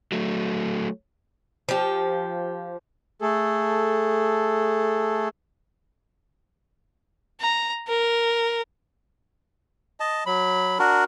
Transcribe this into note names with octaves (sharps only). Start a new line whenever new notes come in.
F#3 A3
F3 G4
A3 G#4 A4
A#5
A#4
D#5 A5
F#3 B5
D4 F#4 A#4